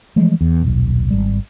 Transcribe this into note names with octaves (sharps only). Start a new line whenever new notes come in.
E3 F3 G#3 A3
E2
D#1 B1
G#1 G3